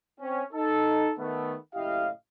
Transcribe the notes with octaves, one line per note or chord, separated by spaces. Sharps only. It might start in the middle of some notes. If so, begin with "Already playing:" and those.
C4 C#4
D#4 A4
D#3 A3 B3
F#1 A2 E4 G4 D#5 F5